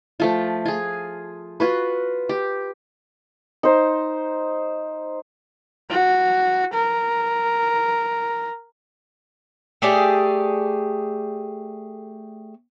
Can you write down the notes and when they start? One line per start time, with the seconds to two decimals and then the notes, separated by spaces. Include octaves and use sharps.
0.20 F3 A3 F4
0.65 F4 G#4
1.60 F4 F#4 B4
2.29 G4
3.63 D#4 C5
5.90 F#4
6.74 A#4
9.82 A3 G4 G#4 D5